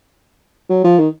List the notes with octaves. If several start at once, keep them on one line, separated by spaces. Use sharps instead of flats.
F#3
F3
D#3